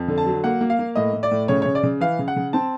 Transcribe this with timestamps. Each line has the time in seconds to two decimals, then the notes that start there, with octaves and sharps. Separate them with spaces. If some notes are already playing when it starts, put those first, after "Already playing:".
Already playing: F2
0.08 D3
0.18 A5
0.27 F#3
0.44 A#3 F#5
0.61 A#3
0.70 F5
0.79 A#3
0.95 A2 D#5
1.13 A2
1.23 D5
1.31 A2
1.48 C#3 C#5
1.62 C#3 C#5
1.75 D5
1.83 C#3
2.01 E3 F5
2.19 C#3
2.28 F#5
2.36 C#3
2.53 C4 A5